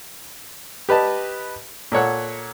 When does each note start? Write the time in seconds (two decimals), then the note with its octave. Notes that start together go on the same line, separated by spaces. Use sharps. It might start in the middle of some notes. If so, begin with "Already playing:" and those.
0.89 G4 B4 D#5 A5
1.92 A#2 A4 C#5 F#5